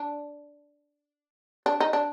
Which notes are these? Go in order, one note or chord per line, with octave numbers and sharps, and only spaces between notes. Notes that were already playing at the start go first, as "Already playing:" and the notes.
Already playing: D4
D4
D#4
D4